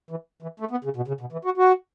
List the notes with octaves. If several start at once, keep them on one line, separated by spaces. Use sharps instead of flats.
E3
E3
A3
B3
C#3
B2
C#3
B2
E3
F#4
F#4